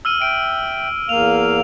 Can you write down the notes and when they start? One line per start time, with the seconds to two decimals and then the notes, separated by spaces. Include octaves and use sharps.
0.05 E6 F6 D#7
0.22 E5 G5 D7
1.09 E2 A#3 F5 F7